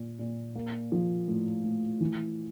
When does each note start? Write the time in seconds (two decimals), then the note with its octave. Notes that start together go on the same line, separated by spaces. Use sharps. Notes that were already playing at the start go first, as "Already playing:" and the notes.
Already playing: A#2
0.19 A#2
0.55 A#3
0.92 F3
1.28 A2
1.64 A2
2.01 E3